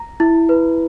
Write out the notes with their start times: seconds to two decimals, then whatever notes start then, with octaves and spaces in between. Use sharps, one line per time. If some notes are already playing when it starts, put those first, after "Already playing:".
Already playing: A#5
0.20 E4
0.49 B4